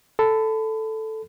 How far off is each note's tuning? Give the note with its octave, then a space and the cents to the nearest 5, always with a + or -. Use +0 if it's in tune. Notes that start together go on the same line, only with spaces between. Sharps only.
A4 +0 B5 +30